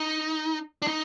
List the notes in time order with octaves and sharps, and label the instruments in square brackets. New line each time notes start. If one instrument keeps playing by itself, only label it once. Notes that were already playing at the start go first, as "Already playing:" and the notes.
Already playing: [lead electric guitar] D#4
D4
D#4